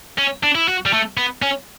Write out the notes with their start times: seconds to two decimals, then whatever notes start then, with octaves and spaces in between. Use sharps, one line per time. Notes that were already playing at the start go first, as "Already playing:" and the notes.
0.18 C#4
0.43 D4
0.55 E4
0.68 F#4
0.86 G3
0.93 A3
1.17 B3
1.42 C#4